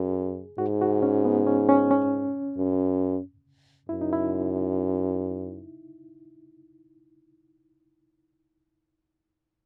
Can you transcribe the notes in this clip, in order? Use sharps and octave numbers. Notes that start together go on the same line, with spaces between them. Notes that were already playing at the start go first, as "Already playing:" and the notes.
Already playing: F#2 G#4
G#2 F#4
F#4
C#4
B3
C#4
C#4
C#4
F#2
F#2 E4
D#4
E4